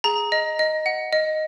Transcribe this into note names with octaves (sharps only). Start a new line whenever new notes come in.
G#4 A#5
D#5
D#5
F#5
D#5